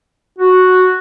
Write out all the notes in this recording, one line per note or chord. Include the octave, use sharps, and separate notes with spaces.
F#4